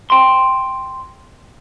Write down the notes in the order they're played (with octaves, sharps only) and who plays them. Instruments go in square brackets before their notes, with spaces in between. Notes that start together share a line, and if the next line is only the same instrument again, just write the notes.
[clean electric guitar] G5 C6